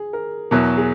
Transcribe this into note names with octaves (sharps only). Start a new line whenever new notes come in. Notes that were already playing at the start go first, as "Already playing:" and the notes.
Already playing: G#4
A#4
E2 B2 F#3 A#4
G#4